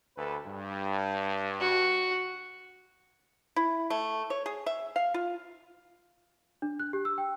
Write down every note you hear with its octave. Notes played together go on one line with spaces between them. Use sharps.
D2 A4 B4
G2
F#4
E4
A3
C#5
G#4
E5
F5
F4
D4
F#6
G4
E6
G5